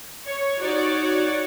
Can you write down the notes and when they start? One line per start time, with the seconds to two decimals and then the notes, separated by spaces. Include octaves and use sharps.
0.25 C#5
0.58 D#4 F#4 C#5 D5